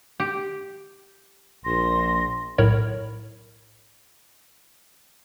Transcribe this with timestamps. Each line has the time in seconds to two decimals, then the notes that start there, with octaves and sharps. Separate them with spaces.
0.20 G4
1.65 A#1 C6 A#6
2.58 B1 A2 A#4 C#5 B5